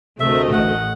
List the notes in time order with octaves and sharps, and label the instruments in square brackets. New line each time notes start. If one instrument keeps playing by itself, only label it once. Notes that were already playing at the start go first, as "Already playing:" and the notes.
[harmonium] D2 [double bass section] C3 [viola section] A3 A#4 D#5 [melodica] E5
[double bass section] A1 [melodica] F#5